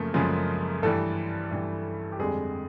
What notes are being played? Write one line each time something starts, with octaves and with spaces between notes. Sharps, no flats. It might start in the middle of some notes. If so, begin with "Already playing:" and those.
Already playing: F#2 C#3 F3 A3 A#3 A4 A#4
F#2 C#3 F3 G#3 G#4
G2 E3 G3 A3 A4
G2 E3 G3
G4
F2 D3 G3 G#3 G#4